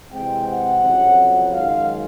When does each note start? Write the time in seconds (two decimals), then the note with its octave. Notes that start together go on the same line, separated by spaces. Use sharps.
0.12 C3 E3 G#3 C4 G5
0.48 F#5
0.84 F2 C#3 F#3
1.54 F#2 D#3 G#3 F5